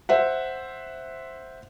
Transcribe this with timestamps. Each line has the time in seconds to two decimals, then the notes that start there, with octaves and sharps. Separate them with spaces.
0.09 C5 E5 F#5